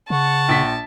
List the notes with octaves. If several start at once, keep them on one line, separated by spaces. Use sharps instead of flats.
C#3 F#5 A5 C#6
A#1 B6